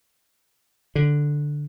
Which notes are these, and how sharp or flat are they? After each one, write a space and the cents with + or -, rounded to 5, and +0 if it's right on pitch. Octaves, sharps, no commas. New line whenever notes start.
D3 +0